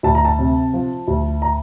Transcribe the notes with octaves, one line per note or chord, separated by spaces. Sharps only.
D2 A5
A#5
A5
C3
F3
D2
A#5